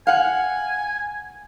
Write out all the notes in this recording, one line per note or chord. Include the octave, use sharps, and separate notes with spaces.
F5 F#5 G#5